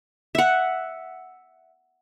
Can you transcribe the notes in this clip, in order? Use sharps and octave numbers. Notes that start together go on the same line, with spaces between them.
E5 F#5